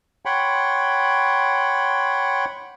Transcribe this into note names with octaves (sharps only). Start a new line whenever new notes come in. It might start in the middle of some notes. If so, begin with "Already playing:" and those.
C#5 F#5 G5 B5 C6